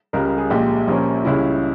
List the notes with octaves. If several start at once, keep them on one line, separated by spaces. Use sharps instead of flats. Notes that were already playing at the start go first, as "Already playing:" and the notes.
C#2 C#3 G3 A#4
A#4
G#4
A#1 A#2 G#3 G4
A#1 A#2 F3 A#3 C#4
C#2 C#3 G3 C#4 E4